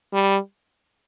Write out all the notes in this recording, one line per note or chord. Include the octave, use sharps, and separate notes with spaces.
G3